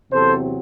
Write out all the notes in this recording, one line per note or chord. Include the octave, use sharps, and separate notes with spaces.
E2 C3 F#3 C4 A4 C5